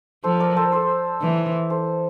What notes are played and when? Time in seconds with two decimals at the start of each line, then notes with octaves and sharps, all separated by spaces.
0.24 F3 A4 C5
0.40 A#4 D5
0.56 A4 C5
0.72 A4 C5
1.21 E3
1.70 A4 C5